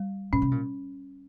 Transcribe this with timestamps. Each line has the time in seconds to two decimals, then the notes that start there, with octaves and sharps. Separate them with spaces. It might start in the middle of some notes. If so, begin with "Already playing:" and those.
Already playing: G3
0.33 A#2 C#4
0.42 C3
0.51 A#2